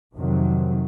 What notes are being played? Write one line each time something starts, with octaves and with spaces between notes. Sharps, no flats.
F2 C3 D#3 F#3